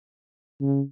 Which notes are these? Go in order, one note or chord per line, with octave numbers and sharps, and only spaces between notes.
C#3